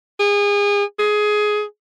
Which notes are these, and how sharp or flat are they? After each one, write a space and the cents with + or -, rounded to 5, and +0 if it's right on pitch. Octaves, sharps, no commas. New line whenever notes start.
G#4 -30
G#4 +15